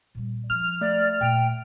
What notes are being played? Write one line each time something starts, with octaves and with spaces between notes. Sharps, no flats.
A#2 G3
F3 D4 F6
A3 D5
A#2 G5